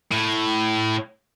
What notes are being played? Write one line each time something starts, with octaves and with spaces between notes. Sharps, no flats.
A2